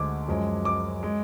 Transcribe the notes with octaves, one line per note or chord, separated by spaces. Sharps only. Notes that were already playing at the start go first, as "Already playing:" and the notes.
Already playing: D2 D3 G#3 D6
F#2 F3 G#3
D6
G#3